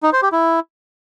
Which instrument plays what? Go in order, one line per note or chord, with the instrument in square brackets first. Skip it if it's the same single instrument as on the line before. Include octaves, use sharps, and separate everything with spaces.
[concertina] D#4
C5
G4
E4